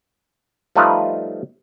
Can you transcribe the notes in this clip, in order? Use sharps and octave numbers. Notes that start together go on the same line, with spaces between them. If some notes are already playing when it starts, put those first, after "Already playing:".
F3 G3 A3 D#4 F4 B4